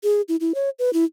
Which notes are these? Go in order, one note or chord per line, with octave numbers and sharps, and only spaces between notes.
G#4
E4
E4
C#5
B4
E4